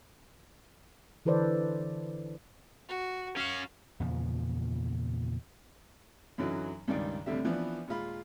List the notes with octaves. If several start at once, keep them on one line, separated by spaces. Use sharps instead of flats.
D3 E3 A4 B4 C5 D5
F#4
C#4 F#4 F5
E2 A#2 C#3 F3
F#2 D3 E3 F#3 D#4
C#2 G2 D#3 D5
C2 F2 A2 D3 G3 E5
E3 F3 B3 D4
D#2 A#2 G#3 F4 B5